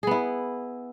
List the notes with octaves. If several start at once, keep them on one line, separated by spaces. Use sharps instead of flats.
B3 E4 G#4